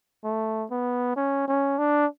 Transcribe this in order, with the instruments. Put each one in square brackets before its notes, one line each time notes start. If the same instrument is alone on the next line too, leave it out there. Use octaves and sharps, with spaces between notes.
[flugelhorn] A3
B3
C#4
C#4
D4